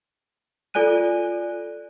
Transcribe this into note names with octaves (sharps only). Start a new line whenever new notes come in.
F4 A4 D5 G#5 F#6 D#7